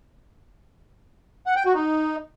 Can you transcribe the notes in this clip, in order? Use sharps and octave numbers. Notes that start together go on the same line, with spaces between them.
F#5
G5
F#4
D#4